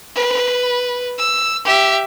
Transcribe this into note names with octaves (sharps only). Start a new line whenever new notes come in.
B4
E6
G4 E5